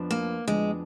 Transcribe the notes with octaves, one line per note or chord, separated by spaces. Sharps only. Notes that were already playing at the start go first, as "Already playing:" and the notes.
Already playing: F2 F3 B3 D4
A#3
F2 F3 G#3 B3 D4